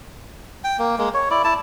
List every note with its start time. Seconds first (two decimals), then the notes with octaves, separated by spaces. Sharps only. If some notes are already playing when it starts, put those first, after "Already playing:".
0.64 G5
0.79 A#3
0.98 G#3 A#3
1.14 C#5
1.30 E4 D5
1.44 E4 A5